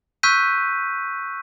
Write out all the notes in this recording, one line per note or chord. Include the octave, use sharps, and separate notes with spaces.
C#6 E6 F#6 G6 B6 D#7